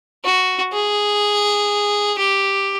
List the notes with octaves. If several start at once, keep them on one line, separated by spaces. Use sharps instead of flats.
F#4
G#4
G4